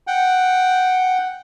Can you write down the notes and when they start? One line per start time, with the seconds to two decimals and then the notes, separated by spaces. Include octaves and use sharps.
0.07 F#5 G5